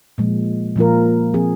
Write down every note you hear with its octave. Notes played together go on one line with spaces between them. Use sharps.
A#2 F3 G#3
A#2 F3 A#3 F4 A#4
F3 C4 G#4